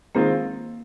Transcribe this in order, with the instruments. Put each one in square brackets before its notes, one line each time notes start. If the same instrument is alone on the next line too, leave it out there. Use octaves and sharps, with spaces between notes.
[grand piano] D#3 G#3 C4 F4 [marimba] A#3